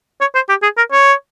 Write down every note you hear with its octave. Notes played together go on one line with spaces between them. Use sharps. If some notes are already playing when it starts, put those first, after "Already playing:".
C#5
C5
G4
G#4
A#4
C#5